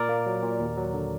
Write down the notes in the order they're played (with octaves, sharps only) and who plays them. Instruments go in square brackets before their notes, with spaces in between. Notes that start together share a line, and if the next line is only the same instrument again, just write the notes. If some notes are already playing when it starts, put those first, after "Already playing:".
Already playing: [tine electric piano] A#2 A#4 D5
A#3
F#3
A#2
D#2
F#3
D3